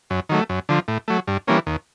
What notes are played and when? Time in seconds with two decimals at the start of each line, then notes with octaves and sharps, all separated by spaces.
0.10 F#2
0.29 D#3 F#3 A3
0.49 F#2
0.69 D3 F3
0.88 A2
1.08 F#3 A3
1.28 G2
1.47 E3 G3 A#3 C#4
1.66 D#2